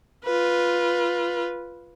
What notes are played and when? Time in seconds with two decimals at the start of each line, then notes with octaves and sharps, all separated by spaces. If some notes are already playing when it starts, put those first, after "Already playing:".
0.25 F4 B4